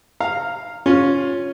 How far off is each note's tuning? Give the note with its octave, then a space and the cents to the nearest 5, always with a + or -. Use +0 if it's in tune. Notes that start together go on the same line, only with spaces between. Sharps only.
F5 +0 A#5 -15
C#4 +0 F4 +15